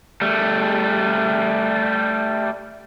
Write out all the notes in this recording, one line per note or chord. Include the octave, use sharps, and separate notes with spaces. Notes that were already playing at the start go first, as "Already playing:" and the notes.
G3 A3